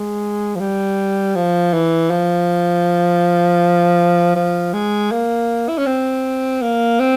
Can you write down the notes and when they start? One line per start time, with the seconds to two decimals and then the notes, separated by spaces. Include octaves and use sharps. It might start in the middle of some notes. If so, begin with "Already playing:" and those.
Already playing: G#3
0.56 F3
0.60 G3
1.35 F3
1.74 E3
2.11 F3
4.36 F3
4.73 G#3
5.12 A#3
5.69 E4
5.78 C#4
5.86 C4
6.62 A#3
7.00 C4